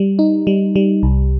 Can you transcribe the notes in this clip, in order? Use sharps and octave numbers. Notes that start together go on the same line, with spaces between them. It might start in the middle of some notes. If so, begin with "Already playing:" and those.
Already playing: G3
D#4
G3
G3
C2